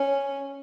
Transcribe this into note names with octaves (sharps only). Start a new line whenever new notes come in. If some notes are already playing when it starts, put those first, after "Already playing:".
Already playing: C#4